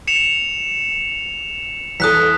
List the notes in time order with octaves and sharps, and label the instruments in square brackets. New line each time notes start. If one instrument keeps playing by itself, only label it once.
[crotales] C#7 E7 F7
[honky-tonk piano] E2 A4 [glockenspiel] D#6 F#6 B6